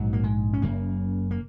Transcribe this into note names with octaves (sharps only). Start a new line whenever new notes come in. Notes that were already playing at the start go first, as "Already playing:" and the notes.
Already playing: A#1 G#2 F#3
A#3
G#3
C#4
F#1 F#2 C#3 A#3
A#3